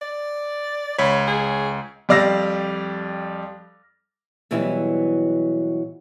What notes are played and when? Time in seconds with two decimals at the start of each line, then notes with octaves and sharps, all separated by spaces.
0.01 D5
0.98 C#2 C#5 B5
1.28 G#4
2.09 F2 G3 D5 F5 E6 A#6
4.51 B2 E3 F#3 G3 C4 E4